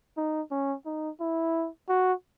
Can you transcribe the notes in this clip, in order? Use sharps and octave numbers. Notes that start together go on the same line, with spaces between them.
D#4
C#4
D#4
E4
F#4